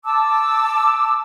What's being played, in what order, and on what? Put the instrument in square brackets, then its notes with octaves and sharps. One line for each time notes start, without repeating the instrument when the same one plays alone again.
[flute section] A5 D6 E6